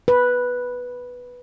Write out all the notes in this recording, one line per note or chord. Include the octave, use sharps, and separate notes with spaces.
B4